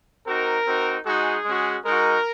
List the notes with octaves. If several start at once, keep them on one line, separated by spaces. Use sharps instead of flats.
C4 D#4 F#4 A#4
C4 D#4 F#4
G#3 D#4 F#4 G#4
G#3 C#4 F#4
G#3 D#4 F#4 A#4